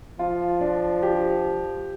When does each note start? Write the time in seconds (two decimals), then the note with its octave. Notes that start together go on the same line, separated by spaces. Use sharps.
0.19 F3 F4
0.61 D4
1.03 G4